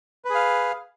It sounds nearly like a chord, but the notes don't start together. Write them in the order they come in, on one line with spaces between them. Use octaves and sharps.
B4 G#4 F5